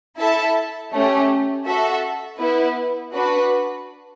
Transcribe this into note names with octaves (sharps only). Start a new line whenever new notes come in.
E4 A4 E5 A5
A3 C#4 G4
F#4 A4 E5
B3 E4 B4
D4 F#4 B4